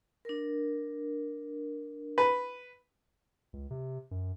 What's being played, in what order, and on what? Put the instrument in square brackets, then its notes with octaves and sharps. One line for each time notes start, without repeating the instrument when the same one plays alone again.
[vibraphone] D4 A#4
[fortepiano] B4
[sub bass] C#2
C3
F#2